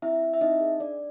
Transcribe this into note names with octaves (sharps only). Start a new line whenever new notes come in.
C4 E4 E5
E4
E5
C4 D#4 D#5
G#4
D4 D5